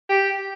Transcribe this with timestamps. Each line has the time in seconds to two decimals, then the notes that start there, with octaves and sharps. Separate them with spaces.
0.09 G4